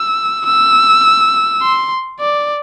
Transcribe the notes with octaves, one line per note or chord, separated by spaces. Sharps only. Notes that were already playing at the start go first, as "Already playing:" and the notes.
Already playing: E6
E6
C6
D5